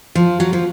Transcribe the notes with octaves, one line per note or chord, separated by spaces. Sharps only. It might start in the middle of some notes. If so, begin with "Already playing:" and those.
F3
F#3
F3